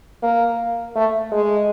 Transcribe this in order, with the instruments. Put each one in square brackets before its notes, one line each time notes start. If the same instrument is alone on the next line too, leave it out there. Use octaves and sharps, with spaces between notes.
[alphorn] A#3
A3
G#3